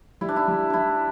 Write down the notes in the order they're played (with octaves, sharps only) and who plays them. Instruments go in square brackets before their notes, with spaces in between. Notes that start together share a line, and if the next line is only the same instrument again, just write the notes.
[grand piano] G3 [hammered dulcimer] E4
[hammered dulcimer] D4
E4
[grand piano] G3
[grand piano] G3 [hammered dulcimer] D4 E4